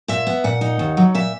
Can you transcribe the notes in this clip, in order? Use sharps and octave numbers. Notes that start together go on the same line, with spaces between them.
A#2 E5
B3
A#2 F#5
D#4
D#2
F#3
A#2 E5